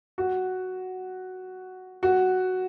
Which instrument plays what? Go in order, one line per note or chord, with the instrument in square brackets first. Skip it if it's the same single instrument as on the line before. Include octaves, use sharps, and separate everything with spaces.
[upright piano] F#4
F#4